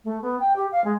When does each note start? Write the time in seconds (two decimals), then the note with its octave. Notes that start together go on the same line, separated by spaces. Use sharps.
0.04 A3
0.22 B3
0.40 G5
0.56 G4
0.72 F5
0.84 G#3